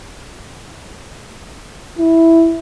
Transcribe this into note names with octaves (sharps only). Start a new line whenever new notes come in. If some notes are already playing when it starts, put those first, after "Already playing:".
E4